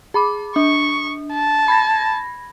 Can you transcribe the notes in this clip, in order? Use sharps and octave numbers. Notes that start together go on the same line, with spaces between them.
G#4 B5 D6
D4 C#6
A5
B5 G#6 A#6